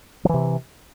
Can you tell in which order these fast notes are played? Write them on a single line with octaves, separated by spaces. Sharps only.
F3 E3 C3